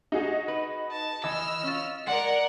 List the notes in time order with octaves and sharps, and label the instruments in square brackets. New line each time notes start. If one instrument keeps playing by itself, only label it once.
[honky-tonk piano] D#4 F#4 G#4
[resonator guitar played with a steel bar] B4
[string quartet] A5
[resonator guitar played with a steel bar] E3 [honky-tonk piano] D#5 [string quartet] E6 F6
[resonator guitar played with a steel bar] C#4 F4
[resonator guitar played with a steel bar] G#3 D5 [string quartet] A#4 F#5